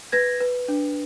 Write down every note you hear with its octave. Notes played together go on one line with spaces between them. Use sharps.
B4 G#6 A#6
B4
D4